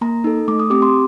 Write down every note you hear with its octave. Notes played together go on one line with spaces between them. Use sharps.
A#3 A#5
D#4 A4
A3 D6
D#6
C4 G4 D6
C6